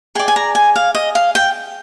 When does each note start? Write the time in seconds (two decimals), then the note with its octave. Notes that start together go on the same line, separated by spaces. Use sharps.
0.15 G#4 D5 G5
0.28 G#5
0.36 A#5
0.55 G#5
0.76 F5
0.95 D#5
1.15 F5
1.35 G5